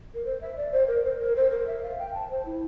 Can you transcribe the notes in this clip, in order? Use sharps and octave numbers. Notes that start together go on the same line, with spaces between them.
A#4
C5
E5
D5
C5
A#4
C5
A#4
C5
A#4
E5
F5
G5
A5
C5
E4